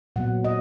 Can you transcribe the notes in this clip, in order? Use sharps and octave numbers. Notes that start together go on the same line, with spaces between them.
A#2 F#3 B3 F#5
D#5